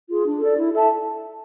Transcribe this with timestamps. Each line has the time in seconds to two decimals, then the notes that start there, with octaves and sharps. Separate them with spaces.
0.08 F4 G#4
0.25 D4
0.40 A4 D5
0.56 E4
0.72 A4 E5 A5